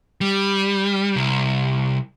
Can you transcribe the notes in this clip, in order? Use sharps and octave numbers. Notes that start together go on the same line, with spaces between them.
G3
C2